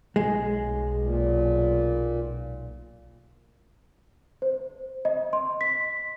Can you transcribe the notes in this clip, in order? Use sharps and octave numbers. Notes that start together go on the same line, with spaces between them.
B1 G#3
A#2
C5
D#5
C6
B6